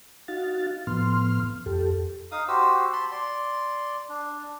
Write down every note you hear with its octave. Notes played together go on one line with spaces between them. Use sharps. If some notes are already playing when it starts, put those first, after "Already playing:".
D#4 F#4 F5 A6
A2 F3 B3 C6 F6
F2 G4 A4
D#4 F5 D#6
F#4 G4 C5 E6
A5 B5 C6
D5 C6
D4